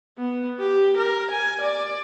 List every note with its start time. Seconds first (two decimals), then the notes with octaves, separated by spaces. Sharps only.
0.18 B3
0.60 G4
0.97 A#4
1.30 G#5
1.61 D5